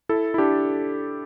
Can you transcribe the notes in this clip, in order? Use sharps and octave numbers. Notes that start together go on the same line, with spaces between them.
E4 A4
E4
D4 G4